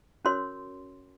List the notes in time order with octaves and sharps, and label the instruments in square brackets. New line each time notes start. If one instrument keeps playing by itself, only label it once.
[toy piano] C#4 F#4 A#4 C#5 C6